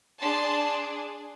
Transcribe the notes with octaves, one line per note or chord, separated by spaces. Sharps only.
D4 G#4 A5 C6